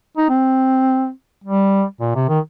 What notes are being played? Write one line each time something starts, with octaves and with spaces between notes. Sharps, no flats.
D#4
C4
G3
A#2
C3
D#3